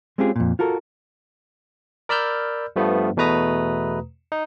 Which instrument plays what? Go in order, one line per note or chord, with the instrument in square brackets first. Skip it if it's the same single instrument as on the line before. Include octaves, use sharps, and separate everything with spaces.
[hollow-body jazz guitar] G#3 C4 C#4 F4 G4 G#4
F2 A#2
F4 F#4 A4 A#4
[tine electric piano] A#4 D5 B5 E6 F6 G6
G2 F3 A3 B3
E2 B2 A3 B4 A#5 D#6
D#4